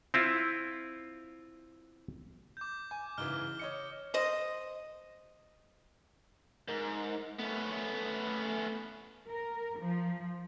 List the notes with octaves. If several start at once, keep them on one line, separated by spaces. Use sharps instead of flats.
C4 E4 F4
D6 G6
G#5
G#2 C#3 E3 F6 G7
C#5 D#5 C#7
C5 D#5
G#2 A#4
A3 B3 C#4
A#4
F3